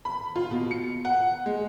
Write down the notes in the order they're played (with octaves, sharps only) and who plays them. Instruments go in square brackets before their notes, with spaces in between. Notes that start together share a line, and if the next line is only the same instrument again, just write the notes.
[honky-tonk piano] B5
F4
B2
C#7
F#5
G#3